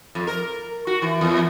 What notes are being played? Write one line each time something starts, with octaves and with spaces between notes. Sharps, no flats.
F2
A#4
F#4
E3
E2